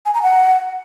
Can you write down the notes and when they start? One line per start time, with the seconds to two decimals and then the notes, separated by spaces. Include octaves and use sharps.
0.06 G#5
0.14 A#5
0.23 F#5